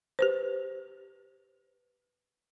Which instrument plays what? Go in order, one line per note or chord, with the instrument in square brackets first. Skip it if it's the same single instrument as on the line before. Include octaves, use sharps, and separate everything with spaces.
[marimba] G4 B4 C5